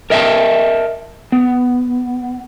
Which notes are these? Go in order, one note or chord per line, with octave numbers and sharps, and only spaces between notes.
A#4 D#5 E5 G5 A5
B3